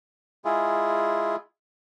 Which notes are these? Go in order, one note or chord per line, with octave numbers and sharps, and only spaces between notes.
G#3 E4 F4 G#4